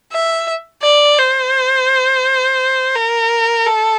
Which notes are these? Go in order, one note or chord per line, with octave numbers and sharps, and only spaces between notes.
E5
D5
C5
A#4
A4